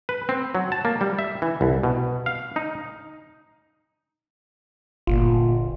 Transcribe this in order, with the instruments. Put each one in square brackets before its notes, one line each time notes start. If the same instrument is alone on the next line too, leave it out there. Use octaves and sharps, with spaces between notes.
[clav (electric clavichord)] B4
C4
F#3
A5
A#3
G3
E5
E3
C2
B2
F5
D#4
[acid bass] G1 [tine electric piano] A#2 F4